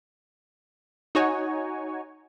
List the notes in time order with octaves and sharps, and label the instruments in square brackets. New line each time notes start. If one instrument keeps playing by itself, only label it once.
[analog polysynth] D#4 F#4 C#5 G#5